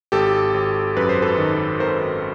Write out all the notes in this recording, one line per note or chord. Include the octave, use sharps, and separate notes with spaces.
G#1 G4 A4
G#1
F#2 B4
C5
A4 B4
D#3
G#1 A#4 C5